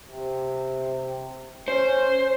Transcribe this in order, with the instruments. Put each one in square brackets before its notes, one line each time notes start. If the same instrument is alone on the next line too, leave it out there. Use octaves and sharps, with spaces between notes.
[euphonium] C3
[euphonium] C#4 [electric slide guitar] C5